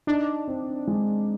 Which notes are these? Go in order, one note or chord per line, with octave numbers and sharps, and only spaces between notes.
D4 D#4
C4
G#3